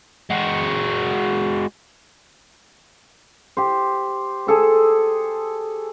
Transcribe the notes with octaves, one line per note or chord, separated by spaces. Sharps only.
G#3 F#4
G4 C5
G#4 A4 C5